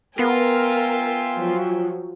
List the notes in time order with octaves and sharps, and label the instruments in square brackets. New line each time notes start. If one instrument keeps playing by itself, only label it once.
[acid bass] B3 [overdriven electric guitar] F4 [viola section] A#4 [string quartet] E5 G5 G#5
[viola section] F3 F#3